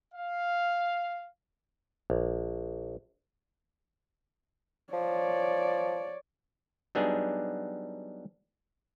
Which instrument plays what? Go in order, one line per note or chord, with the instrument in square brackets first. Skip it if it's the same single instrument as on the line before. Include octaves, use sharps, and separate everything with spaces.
[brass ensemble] F5
[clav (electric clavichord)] A#1
[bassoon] F3 [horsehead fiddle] C#5 D5
[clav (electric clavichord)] F#3 G3 B3 D4 D#4 G#4